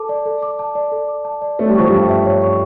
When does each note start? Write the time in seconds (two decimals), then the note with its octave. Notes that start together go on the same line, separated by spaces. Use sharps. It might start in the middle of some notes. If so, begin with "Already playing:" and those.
Already playing: A4 A5 D6
0.09 D5
0.26 A4
0.42 D6
0.59 A5
0.75 D5
0.92 A4
1.08 D6
1.25 A5
1.42 D5
1.59 A3 C#5
1.69 G3
1.75 F3 C#6
1.88 G2 G3 A5
2.09 E5
2.25 C#5
2.42 C#6